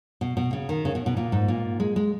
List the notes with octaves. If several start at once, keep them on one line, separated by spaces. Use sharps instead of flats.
B2
B2
C#3
D#3
C#3
B2
B2
A#2
G#2
A#2
G#3
G#3